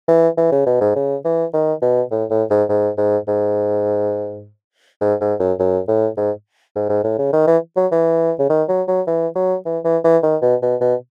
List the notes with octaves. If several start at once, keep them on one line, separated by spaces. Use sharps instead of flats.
E3
E3
C#3
B2
G#2
C#3
E3
D#3
B2
A2
A2
G#2
G#2
G#2
G#2
G#2
G#2
F#2
F#2
A2
G#2
G#2
G#2
A2
C#3
D#3
E3
F#3
E3
C#3
D#3
F#3
F#3
E3
F#3
E3
E3
E3
D#3
B2
B2
B2